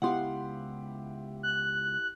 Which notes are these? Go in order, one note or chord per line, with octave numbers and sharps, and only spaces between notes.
C#2 B3 E4 G4 F5 F#5 C6
F#6